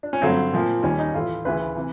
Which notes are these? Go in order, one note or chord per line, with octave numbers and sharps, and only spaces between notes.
D4
C#4
G2 D3 F#3 A3 C4
A#2 F3 A#3
D#2 D#3 G3 C#4
D#4
A2 E3 A3 F4
D2 C#3 E3 B4
C3 E3